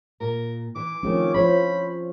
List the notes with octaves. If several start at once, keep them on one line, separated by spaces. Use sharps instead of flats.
A#2 A#4
E3 D6
D#3 F3 A3 C4 C#4
F3 E4 C5 C#5 B5